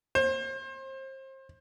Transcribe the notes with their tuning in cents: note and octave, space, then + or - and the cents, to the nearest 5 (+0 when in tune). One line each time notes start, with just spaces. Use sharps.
C5 +30